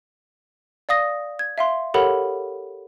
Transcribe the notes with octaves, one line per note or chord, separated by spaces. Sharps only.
D5 F5 D#6 A#6
G#6
E5 F5 C6
G4 A4 A#4 C#5 F#5 B5